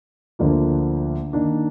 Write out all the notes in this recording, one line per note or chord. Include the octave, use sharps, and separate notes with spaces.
D2 D3 F3 A#3 D4
D#3 A#3 D4